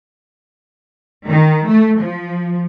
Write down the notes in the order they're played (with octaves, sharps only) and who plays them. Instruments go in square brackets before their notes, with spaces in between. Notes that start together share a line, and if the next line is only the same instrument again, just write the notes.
[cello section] D#3
A3
F3